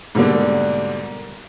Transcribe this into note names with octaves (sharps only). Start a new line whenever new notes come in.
G#2 B2 D3 G3 A#3